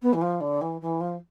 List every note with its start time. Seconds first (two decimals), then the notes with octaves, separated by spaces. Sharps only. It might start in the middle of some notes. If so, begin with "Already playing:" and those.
0.02 B3
0.13 E3
0.21 F3
0.41 D3
0.61 E3
0.81 E3
1.01 F3